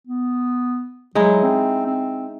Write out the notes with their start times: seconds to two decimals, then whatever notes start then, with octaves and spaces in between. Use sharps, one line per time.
0.07 B3
1.15 F#3 G#3 D#4 E4
1.43 C4
1.86 C4